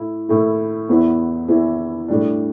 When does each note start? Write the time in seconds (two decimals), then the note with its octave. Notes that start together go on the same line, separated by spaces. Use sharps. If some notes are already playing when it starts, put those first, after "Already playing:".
Already playing: A2 A3 E4
0.29 A2 A3 E4
0.89 E2 E3 B3 E4
1.48 E2 E3 B3 E4
2.08 A2 G3 D4